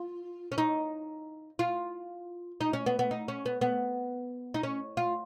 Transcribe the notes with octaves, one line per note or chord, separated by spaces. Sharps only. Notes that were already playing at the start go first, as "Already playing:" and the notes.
Already playing: F4
C#4
D#4
F4
D#4
C#4
B3
B3
D#4
C#4
B3
B3
D#4
C#4
F4